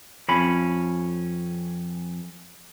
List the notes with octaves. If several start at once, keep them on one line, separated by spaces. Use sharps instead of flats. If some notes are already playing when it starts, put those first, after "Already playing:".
F2 C#4 B5